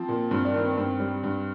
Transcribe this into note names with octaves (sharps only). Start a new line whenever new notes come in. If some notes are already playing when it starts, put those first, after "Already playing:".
Already playing: F3 C4
A#2
G2 C4
D4
D#3 C4
D4
G2 C4
G3
G2